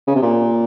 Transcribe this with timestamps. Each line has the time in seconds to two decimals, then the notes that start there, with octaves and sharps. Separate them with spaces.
0.07 C#3
0.15 C3
0.22 A#2